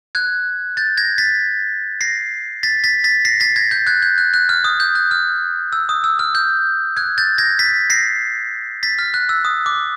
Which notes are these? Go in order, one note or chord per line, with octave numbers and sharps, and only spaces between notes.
F#6 G#6
G6 A6
G#6 A#6
A6 B6
A#6 C7
A6 B6
A6 B6
A6 B6
A#6 C7
A6 B6
G#6 A#6
G6 A6
F#6 G#6
G6
F#6
F#6
F6
D#6
G6
F#6
F6
E6
D#6
E6
F6
G6
F#6 G#6
G6 A6
G#6 A#6
A6 B6
A#6 C7
A6 B6
F6
F#6
E6
D#6
D6